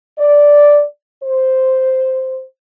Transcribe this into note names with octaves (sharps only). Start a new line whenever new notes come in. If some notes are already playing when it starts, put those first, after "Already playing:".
D5
C5